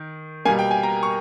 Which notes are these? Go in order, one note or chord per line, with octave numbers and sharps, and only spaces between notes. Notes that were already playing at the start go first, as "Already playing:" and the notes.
Already playing: D#3
B2 G3 A#3 G#5
G5
G#5
A#5
C#6